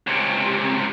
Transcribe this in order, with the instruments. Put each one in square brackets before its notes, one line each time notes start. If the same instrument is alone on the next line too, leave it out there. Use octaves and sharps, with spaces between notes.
[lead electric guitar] C#2 C3